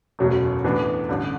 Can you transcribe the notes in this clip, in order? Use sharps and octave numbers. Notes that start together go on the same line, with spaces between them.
F#1 E2 B2 F#3 A3
A2 E3 B3 D4
A1 G2 D3